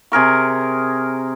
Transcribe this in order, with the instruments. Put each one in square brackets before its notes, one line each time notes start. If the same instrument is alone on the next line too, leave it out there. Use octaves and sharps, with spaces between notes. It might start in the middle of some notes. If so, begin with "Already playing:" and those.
[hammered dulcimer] C3 G#4 A#4 C#6